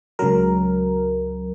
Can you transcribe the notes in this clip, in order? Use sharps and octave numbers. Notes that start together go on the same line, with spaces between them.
C#2 C#3 F#3 A#4